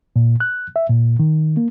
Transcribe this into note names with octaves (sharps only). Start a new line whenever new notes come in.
A#2
F#6
E5
A#2
D#3
A#3